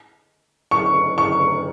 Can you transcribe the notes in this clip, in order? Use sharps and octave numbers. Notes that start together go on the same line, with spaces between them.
C#6
C#6